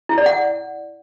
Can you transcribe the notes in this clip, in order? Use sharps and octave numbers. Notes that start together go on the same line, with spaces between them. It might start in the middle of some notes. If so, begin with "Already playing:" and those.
E4
D5
F#5